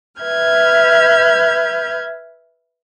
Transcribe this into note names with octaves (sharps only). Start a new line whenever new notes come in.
B4 E5 F6 G6 G#6